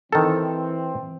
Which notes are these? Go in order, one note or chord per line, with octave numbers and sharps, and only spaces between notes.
D#3 E3 C4 A4